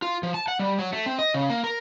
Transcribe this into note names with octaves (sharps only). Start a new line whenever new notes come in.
F4
F3
A5
F#5
G3
F#3
A3
C4
D#5
C#3
A#3
A#4